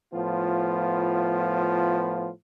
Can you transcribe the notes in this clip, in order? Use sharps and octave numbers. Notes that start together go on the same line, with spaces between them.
A2 F3 B3 F4